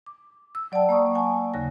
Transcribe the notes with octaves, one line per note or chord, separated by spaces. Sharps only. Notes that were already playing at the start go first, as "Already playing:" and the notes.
D6
E6
F#3 D5 F#5 G5 A5
A#3 D5 C#6 D#6
F#5 G#5 A5 C#6
D#2 C#3 A#6